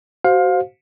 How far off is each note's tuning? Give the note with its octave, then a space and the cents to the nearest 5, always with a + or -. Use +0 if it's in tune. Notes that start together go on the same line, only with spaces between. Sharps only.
F#4 +25 C5 +0 F5 +25